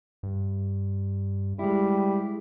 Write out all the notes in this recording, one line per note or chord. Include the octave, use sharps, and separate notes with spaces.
G2
G3 G#3 E4